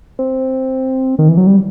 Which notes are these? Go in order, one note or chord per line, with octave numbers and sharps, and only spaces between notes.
C4
D#3
E3
F#3
G3